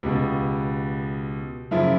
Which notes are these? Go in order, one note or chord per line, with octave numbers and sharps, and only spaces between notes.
C#2 B2 G4
F#2 C#3 F3 E4